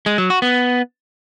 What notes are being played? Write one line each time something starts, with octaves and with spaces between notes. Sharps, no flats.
G#3
F#3
F#4
B3